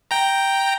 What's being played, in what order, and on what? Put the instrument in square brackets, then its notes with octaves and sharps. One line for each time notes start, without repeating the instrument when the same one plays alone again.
[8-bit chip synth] G5 A#5